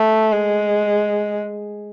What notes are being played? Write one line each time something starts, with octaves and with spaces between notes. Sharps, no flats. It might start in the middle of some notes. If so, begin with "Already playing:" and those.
Already playing: A3
G#3